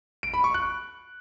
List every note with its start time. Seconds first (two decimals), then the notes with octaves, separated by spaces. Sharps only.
0.23 D7
0.34 B5
0.44 C#6
0.54 F#6